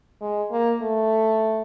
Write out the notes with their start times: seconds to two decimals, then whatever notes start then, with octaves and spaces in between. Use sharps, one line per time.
0.21 G#3
0.52 A#3
0.82 A3